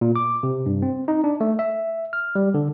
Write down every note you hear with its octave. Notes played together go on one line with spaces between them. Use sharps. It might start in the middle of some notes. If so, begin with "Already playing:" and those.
A#2
D6
C3
G2
C4
D#4
D4
A3
E5
F6
G3
D3